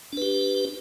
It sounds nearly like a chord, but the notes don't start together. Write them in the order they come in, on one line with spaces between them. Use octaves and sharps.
D4 B4 G4